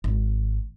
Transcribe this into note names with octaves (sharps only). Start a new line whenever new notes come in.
G#1